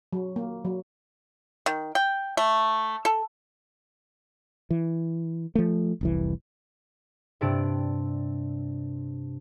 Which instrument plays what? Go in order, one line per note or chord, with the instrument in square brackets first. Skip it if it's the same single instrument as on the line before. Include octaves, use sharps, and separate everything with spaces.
[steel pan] F#3
A#3
F#3
[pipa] D#3
G5
A3
A4
[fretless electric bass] E3
F3 A3
F1 C2 E3
[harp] G2 C3 D4 D7